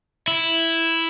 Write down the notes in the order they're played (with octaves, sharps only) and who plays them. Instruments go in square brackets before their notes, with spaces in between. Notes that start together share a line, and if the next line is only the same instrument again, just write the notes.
[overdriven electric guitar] E4